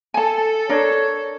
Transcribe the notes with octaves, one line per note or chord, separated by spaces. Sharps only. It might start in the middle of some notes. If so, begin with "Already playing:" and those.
A4 G#5 A5
D4 A#4 C#5